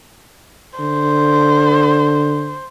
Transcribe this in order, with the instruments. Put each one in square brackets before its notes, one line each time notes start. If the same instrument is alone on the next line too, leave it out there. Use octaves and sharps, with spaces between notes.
[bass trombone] D3 [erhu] C5